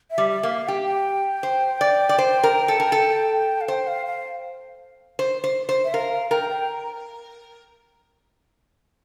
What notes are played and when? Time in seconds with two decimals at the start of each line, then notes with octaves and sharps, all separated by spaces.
0.11 E5
0.18 G3
0.31 E5
0.43 A#3
0.49 F5
0.68 G4 G5
0.85 G5
1.43 C5
1.81 D5
2.09 D5
2.18 C5
2.43 A#4
2.68 A4
2.80 A#4
2.92 A4
3.61 F5
3.68 C5 G5
3.87 F5
4.06 F5
5.19 C5
5.44 C5
5.69 C5
5.85 E5
5.93 A#4 F5
6.13 F5
6.31 A#4 G5
6.50 G5